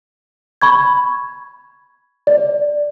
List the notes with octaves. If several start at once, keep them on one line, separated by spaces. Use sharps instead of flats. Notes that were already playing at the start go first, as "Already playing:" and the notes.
B5 C#6 G#6
D5